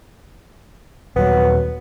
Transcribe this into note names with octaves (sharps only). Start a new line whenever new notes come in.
D#1 F#3 B3